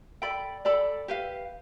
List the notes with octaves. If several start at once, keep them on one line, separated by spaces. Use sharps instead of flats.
A4 D5 G5 B5
A4 D5 G5 B5
G4 B4 F5